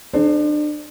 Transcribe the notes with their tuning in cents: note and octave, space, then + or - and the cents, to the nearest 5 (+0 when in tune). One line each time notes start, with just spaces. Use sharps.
D4 +35 A4 -45 C5 +0